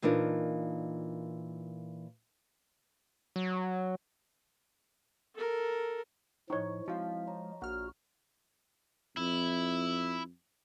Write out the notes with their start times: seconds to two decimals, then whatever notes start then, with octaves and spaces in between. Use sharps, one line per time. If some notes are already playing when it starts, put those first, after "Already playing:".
0.02 A#2 E3 D4 D#4 F4 A#4
3.36 F#3
5.35 A4 A#4
6.50 A2 F3 D#4 C#5 C#6
6.88 F3 G#3 C4 E4 F#4 F5
7.27 C#5 A#5
7.62 A#1 F#4 F#5 F6
9.17 F2 E4